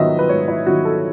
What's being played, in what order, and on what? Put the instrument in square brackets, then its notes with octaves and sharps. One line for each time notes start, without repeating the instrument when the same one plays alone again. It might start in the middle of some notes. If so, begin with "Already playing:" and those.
Already playing: [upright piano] G#2 D#3 F#3 B3 D#5 E5
B4
G#2 C#5
E4
D#3 F#3 B3 F#4
A4